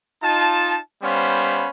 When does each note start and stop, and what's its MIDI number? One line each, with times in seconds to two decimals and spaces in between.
0.23 0.78 63
0.23 0.78 65
0.23 0.78 81
1.02 1.70 55
1.02 1.70 59
1.02 1.70 61
1.02 1.70 72
1.02 1.70 77
1.02 1.70 83